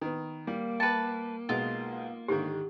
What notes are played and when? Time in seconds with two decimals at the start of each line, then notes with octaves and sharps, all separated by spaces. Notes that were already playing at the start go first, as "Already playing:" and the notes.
0.01 D#3 B3
0.47 G3 A#3
0.80 B4 G5 A5
1.49 B1 B2 G#3 F4
2.28 G#2 D3 D#3 G4